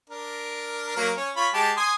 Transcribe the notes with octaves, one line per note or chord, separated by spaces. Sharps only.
D4 A#4
F#3 A#3 A#4
C#4
F4 C#5 B5
G#3 G4 A5
G#5 C6 D#6